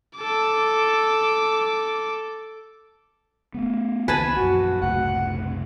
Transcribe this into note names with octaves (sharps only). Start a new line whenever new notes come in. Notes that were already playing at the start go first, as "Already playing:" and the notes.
A4 D6
A3 B3
C#2 D#3 E3 B4 G#5 A5 B5
A#1 F#2 F#4
F#1 C2 A2 F#5